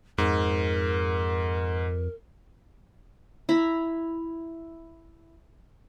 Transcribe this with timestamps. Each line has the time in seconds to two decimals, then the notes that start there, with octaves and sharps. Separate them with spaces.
0.18 F2 G#2 A#4
3.49 E4 A#5 B5